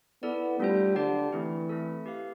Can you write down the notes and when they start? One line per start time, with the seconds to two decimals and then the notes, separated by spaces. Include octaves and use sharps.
0.23 B3 E4 A4 D5
0.60 G3 A3 D4 F4 C5
0.96 D3 G4 D5 G5
1.32 E3 A3 C4 E4
1.69 A3 C4 E4 A4
2.06 G4 B4 F5